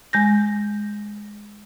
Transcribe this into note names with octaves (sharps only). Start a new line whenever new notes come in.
G#3 G6 A#6